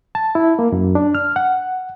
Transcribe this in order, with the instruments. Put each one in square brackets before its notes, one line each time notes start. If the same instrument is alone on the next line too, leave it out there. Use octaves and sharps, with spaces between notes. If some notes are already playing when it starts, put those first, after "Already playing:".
[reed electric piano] A5
E4
A#3
F#2
D4
F6
F#5